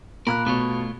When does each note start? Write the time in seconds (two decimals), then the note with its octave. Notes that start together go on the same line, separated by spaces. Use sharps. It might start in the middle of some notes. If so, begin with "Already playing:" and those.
0.27 A#2 A#4 B5 F6 F#6
0.46 B2 A3 F4 C#5